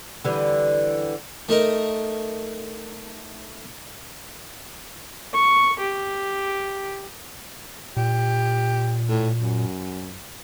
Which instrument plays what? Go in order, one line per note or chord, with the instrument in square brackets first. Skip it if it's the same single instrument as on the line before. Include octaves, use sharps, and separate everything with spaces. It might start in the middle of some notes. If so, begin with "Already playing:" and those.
[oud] D3 E3 G3
[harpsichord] A3 D#4 A#4
[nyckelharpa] C#6
G4
[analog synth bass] A#2 [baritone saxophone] G4
[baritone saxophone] A2
F#2